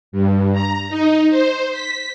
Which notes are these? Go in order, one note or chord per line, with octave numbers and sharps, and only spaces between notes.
G2
A#5
D#4
C5
B6